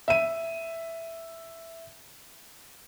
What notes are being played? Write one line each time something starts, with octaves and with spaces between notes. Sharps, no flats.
E5 D#7